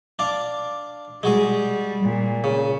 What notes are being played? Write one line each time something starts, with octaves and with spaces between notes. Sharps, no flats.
D4 D5 F5
G3 G#3 F#4 G#4
A#2
C#3